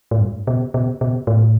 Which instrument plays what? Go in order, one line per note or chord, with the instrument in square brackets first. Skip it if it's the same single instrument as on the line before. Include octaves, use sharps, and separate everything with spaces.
[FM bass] A2
G2
B2
B2
B2
A2